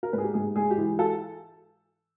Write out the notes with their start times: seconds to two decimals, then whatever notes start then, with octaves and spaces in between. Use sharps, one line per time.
0.03 A#4
0.13 G#2 B4
0.18 G#4
0.24 G4
0.34 G#2 G#4
0.56 G#3 G#4
0.71 G4
0.78 E3
0.99 A4